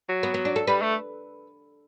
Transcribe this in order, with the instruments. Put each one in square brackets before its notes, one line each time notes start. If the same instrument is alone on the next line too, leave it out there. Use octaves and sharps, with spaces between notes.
[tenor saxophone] F#3
[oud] B3
B3
D4
A4
[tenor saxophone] G3 [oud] B4
[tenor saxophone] A3